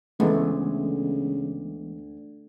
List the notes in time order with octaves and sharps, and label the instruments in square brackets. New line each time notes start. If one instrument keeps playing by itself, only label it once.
[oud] D2 [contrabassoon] C#3 [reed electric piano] E3 G#3 B3 [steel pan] A3